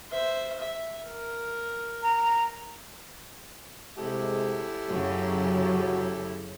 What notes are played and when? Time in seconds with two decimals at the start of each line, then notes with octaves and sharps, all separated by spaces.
0.10 C5 E5
0.60 E5
1.06 A#4
2.03 A#5
3.98 C3 G#3 E4 G4 A4
4.88 F#2 C#3 F#3